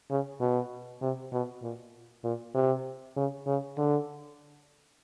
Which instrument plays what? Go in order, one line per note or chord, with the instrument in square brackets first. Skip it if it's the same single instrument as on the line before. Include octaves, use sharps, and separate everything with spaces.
[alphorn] C#3
B2
C3
B2
A#2
A#2
C3
C#3
C#3
D3